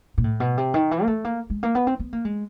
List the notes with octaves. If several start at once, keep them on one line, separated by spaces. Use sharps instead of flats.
A#2
A2
B2
C3
D#3
E3
A#3
A3
A#3
G#3
A#3
B3
C4
B3
A#3
G#3